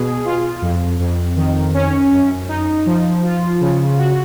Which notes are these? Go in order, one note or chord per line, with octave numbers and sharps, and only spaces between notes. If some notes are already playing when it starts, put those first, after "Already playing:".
Already playing: B2 G#4
F4
F2
F2
D#3
C#4
F#2
D#4
F3
F4
C#3
F#4